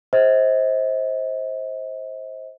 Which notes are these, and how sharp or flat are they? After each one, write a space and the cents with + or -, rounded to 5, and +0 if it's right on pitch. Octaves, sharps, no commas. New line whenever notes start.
C5 +10 D#5 +40